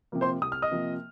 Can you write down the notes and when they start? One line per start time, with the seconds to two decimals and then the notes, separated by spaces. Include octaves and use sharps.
0.12 C3 F3 A#3
0.21 C5 C6
0.41 C2 D#6
0.52 F6
0.62 D#5 D#6
0.71 C3 F3 A#3